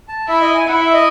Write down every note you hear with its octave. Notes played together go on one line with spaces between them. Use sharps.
A5
E4 E5
D#5
G#5
E4 F#5
E5
D#5